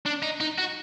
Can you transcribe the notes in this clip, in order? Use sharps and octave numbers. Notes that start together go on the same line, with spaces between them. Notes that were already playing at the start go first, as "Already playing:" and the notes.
D4
D#4
D#4
F#4